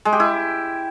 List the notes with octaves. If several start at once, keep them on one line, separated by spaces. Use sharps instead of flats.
G#3
G4
E4